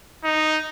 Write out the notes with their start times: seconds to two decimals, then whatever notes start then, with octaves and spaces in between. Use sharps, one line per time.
0.24 D#4